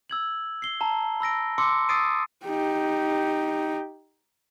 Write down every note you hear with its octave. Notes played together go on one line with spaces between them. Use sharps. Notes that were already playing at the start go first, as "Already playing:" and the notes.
E6 G#6 F#7
C7 G7
A5 A#5
B5 E6 A#6 D7
C6 D6 E6 C#7
D#6 E6 A6 C7 D7 D#7
D#4 G4